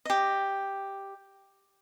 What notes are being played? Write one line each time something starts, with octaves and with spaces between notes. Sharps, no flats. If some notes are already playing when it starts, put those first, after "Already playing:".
G4 D#5